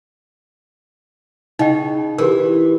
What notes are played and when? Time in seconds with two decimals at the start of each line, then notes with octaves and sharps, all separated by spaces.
1.59 C#3 D#4 D#5 G5
2.18 E3 G4 G#4 A#4